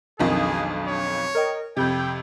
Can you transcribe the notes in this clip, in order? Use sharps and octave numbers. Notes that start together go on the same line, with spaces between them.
B1 F2 D#3 D4 G#4 D#6
C#5
A#4 D#5 G5
F2 C3 G5 B5 G6 G#6